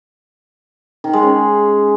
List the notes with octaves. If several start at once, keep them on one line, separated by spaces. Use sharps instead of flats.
D#3
G#3
C#4